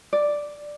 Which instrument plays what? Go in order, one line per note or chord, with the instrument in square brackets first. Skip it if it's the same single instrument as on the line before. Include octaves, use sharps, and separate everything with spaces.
[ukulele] D5